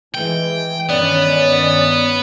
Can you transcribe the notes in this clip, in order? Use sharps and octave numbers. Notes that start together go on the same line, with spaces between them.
E3 G#3 G5
G2 D#3 B3 C#4 D5